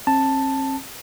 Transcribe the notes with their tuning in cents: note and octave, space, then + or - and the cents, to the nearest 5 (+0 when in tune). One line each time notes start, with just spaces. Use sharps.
C4 +45 A5 +5